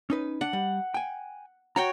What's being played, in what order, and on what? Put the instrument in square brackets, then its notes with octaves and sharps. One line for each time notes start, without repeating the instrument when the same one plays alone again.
[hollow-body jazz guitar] C#4 D#4 B4
[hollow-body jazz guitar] D4 [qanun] F#5
[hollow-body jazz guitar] G3
G5 G#5
[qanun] F#4 C#5 G5 [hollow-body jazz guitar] A#5